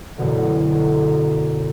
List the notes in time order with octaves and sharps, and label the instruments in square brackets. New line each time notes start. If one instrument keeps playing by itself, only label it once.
[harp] A1 F#2 B2 D3